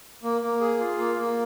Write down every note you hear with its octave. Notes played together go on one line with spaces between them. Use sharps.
A#3
A#3
G#4
F4
A#3
A#3